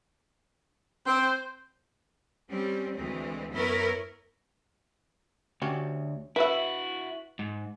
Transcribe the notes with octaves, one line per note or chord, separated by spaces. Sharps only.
C4 C5
G3 C4 C#4
D2 E3 G#3 C4
F#2 B3 E4 A#4 B4 C#5
D2 C#4 F#4 G4
E4 F#4 B4 E5
G#2